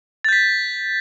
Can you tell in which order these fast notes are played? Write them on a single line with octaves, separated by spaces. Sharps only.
A6 G6 B6